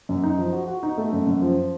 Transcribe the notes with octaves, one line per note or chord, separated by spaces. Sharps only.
F#2
D#4
F3
F#4
F#4
D#4
A3
F#2
F#2
F3